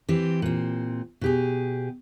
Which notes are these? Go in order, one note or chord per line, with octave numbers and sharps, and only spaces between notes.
E3 C4 G4
A#2 C4
B2 G4 G#4